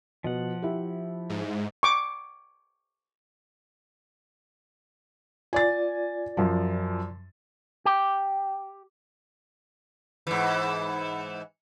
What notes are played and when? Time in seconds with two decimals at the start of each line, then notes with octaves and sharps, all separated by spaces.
0.24 B2 F3 F#5
0.62 E4 G4
1.30 G#2
1.83 C#6 D6
5.53 F4 D5 G#5 A6
6.37 F#2 F3
7.85 G4
10.27 G#2 E3